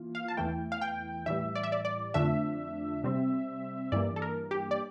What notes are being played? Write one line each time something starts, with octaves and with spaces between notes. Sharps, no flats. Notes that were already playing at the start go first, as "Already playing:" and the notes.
Already playing: E3 A#3 F4
F5
A5
E2 E3 A3 E4 G5
F5
G5
A2 E3 G3 E5
D5
E5
D5
D5
F2 D3 F3 A3 D4 E5
C3 G3 C4
G2 E3 G3 A#3 D5
A4
A#4
G4
D5